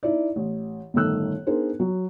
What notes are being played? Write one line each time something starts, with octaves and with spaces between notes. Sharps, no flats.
D#4 E4 D5
A1
G1 A2 D#3 A3 E6 F#6
B3 D4 D#4 G#4 A#4 C5
F#3